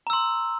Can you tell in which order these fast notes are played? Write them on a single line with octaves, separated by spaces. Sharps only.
A#5 E6 C6